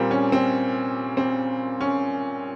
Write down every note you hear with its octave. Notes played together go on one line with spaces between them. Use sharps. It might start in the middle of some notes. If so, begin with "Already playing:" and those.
Already playing: A#2 G3 A#3 C4
C#4
C4
C4
C#4